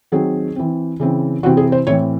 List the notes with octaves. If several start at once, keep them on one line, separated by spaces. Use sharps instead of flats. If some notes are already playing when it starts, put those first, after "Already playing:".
D#3 F#3 C4 G#4
E3 C4
C#3 E3 C4
C3 E3 C4 F#4
G#4
C5
A2 E3 C4 C#5